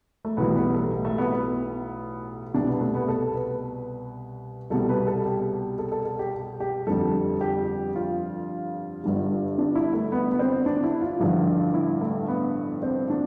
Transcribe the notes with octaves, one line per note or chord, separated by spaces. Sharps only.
A3
B1 A2 E3 G3 B3
B3
A3
A3
B3
B3
C2 B2 G3 D4
B3
A3
B3
A4
B4
C2 B2 G3 A4
B4
A4
G4
A4
A4
A4
G4
G4
G1 F2 D3 G3 A4
G4
F4
G1 G2 D3 G3
D4
E4
A3
B3
B3
C4
D4
E4
F4
A1 G2 D3 F3
E4
A3
B3
C4
D4